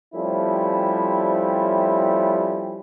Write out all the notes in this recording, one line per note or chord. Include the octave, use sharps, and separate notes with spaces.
F3 G3 A3 C4 C#4 E4